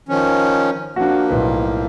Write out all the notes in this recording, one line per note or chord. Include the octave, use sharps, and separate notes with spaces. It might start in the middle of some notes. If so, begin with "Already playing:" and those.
D#3 F3 C#4
F3 A#3 D4 F#4
B1 A2 B4